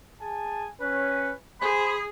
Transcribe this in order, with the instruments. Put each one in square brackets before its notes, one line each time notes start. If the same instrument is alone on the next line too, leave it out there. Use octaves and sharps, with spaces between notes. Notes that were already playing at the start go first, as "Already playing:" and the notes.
[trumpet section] G#4 G#5 A5
[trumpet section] C#4 [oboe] B4
[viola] G#4 [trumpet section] C5 G#5 [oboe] B5